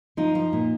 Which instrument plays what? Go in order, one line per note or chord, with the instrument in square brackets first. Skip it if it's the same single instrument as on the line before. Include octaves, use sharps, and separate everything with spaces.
[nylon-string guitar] F3 D#4
F3
A#2